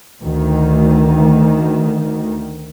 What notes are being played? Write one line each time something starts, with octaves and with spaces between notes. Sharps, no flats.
D2 D#3